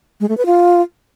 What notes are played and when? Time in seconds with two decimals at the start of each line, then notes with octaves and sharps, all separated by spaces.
0.20 G#3
0.29 A3
0.37 B4
0.46 F4